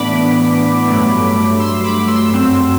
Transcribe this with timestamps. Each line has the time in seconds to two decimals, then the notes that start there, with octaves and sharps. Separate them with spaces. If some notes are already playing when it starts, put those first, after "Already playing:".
Already playing: A2 E3 B3 D4 B5 D6
0.87 G2 F#3 A3
1.60 C6 E6
1.83 B5 D6
2.07 C6 E6
2.31 F#2 F#3 C4